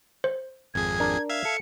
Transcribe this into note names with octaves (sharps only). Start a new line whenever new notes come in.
C5
G#1 F2 G#4 G#6
D4 A#4
E5 F5 G#6
A4 C#7